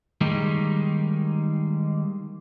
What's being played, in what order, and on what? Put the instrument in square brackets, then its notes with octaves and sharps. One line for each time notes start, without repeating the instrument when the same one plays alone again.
[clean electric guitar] D#3 G3 G#3 A#3 D#4